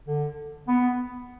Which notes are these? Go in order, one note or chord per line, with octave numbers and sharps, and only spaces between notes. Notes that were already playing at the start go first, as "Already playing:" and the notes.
D3
B3